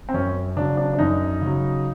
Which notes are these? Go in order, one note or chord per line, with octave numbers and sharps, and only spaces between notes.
C4
F#2 C#4
C#3 F#3 D4
D4
D4
F#2 D#4
C#3 F#3